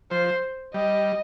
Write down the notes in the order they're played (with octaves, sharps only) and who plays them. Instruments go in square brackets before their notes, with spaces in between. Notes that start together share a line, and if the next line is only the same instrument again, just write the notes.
[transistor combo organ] F3 [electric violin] C5
[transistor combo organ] G3 [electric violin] D#5